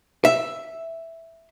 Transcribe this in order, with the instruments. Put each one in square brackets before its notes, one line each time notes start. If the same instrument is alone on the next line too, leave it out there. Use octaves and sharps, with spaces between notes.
[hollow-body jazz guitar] E5